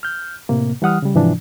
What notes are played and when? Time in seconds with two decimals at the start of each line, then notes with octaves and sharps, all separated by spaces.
0.03 F6 G6
0.49 A2 C3 A#3
0.82 E3 G3 F#5 D#6 F6
1.02 C#3 G3
1.15 G#2 C3 E3 F3 D4